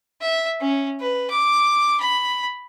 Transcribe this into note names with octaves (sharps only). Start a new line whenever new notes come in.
E5
C#4
B4
D6
B5